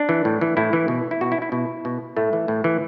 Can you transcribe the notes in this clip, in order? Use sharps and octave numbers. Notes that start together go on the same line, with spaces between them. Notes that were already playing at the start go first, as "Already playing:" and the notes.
Already playing: D4
E3
A2
E3
A2 E4
E3
B2
E4
B2 F#4
E4
E4
B2 E4
B2
A2 A3
E3
A2
E3